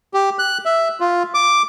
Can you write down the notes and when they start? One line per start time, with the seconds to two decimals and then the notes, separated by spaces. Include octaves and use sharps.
0.14 G4
0.39 F#6
0.65 E5
1.00 F4
1.34 D6